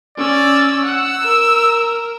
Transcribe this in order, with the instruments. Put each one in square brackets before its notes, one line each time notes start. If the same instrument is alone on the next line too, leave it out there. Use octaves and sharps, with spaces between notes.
[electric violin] C#4 E6 [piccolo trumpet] D5
[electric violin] F#5 [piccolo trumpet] E6
[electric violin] A#4